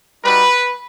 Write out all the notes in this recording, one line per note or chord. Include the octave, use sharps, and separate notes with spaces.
G3 D#4 F#4 B4